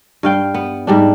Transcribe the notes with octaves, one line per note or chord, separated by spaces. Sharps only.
G2 F5 G5
B3
G#2 G3 D4